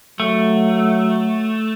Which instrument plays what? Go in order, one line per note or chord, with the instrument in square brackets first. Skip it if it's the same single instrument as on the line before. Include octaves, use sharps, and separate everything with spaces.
[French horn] F#3 [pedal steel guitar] A3